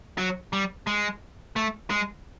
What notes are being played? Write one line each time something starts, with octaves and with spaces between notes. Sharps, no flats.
F#3
G3
G#3
A3
G#3